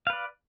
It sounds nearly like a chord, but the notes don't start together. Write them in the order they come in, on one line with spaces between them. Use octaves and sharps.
F5 B4 D5